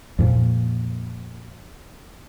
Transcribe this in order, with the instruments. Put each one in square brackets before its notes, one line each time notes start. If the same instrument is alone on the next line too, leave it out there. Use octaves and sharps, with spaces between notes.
[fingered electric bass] F2 A#2